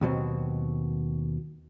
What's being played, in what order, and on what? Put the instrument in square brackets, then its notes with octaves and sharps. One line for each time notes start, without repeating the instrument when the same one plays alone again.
[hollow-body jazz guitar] D#2 B2 F#3 C4